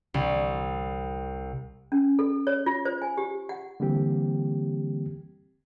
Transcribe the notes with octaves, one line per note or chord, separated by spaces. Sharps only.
C2
C#4
A4
C#5
F4
C5
G#5
G4
F#5
D3 E3 G3 A#3 C4 G4